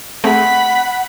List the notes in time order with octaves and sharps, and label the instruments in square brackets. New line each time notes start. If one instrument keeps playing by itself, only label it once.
[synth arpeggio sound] A3 C4 G#4 [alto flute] F#5 [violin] B5